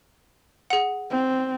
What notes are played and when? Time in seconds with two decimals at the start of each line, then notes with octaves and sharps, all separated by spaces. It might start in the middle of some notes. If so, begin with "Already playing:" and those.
0.70 G#4 F#5
1.11 C4